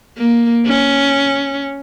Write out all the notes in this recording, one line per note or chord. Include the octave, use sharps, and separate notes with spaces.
A#3
C#4